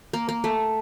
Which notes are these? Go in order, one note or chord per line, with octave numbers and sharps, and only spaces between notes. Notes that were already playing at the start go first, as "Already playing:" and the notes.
A#3
A#3
A3